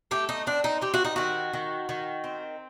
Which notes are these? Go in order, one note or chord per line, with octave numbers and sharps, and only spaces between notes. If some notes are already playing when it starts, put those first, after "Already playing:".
A3 G4
D#4
C4 D4
D#4
C4 G4
F#4
D#4
D#3 F#4
D#3
D#3
C4